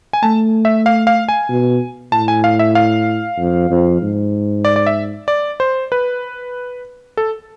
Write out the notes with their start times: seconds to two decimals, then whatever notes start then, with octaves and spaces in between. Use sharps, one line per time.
0.13 G#5
0.23 A3 A5
0.65 E5
0.86 F5
1.07 F5
1.29 G#5
1.49 B2
2.12 A2 A5
2.28 G#5
2.44 F5
2.59 E5
2.75 F5
3.38 F2
3.70 F2
4.02 G#2
4.65 D5
4.76 D5
4.87 E5
5.28 D5
5.60 C5
5.92 B4
7.17 A4